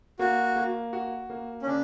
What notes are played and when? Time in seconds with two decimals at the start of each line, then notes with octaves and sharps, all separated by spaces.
0.19 A#3 F#4
0.56 A#3
0.93 F#4
1.30 A#3
1.62 C#4
1.66 C#3 D4